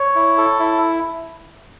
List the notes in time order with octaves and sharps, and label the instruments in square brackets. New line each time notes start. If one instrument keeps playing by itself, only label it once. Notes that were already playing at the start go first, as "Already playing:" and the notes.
Already playing: [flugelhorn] C#5
[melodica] E4
A4
E4